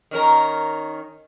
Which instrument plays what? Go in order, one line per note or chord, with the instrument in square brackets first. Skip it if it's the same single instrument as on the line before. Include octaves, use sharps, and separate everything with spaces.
[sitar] D#3 C#4 A#4